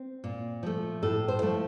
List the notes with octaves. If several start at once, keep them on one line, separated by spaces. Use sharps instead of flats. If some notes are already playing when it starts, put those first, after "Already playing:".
Already playing: C4
A#2
F3 A3
A2 A4
C5
F3 A3